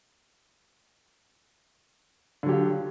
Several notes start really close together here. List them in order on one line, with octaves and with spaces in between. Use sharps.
D3 F#3 G4 F4